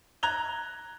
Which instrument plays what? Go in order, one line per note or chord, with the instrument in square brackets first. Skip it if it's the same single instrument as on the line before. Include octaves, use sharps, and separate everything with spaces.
[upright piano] A#5 F#6 G#6 F7 G7